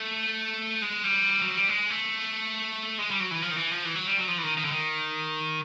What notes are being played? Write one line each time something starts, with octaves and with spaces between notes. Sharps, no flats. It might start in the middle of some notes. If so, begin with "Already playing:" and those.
Already playing: A3
G#3
G3
F#3
G3
G#3
A3
G#3
G3
F#3
E3
F3
D#3
E3
F3
E3
F#3
G3
F#3
F3
E3
D#3
D#3
D3
D#3